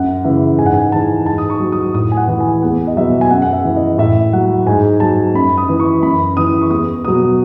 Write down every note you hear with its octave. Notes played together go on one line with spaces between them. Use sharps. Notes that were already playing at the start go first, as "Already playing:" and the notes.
Already playing: F#2 F#5
C#3 E3 E5
G#2 G#5
F#5
G#5
E3 A5
G#2 A5
D#6
C#6
F#3
D#6
A2 D#6
G#5
F#5
E3
G#5
E2 F#5
D#5
B2 F#3 E5
G#5
F#2 F#5
F#5
E5
E3
D#5
A2 E5
F#3 F#5
G#2 G#5
F#3 A5
F#2 B5
D#6
E3
C#6
F#2 B5
E3 D#6
C#6
E2 D#6
B2 F#3 D#6